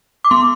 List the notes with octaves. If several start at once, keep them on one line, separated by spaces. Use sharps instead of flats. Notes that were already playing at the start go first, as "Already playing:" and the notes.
D6
B3 C6